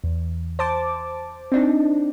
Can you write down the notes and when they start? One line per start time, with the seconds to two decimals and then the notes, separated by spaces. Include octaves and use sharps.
0.04 E2
0.59 C5 A5 D6
1.52 C4 D4 D#4